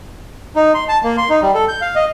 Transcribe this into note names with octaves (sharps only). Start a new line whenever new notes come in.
D#4
C6
A5
A#3
C6
D#4
G3
A4
G6
F5
D#5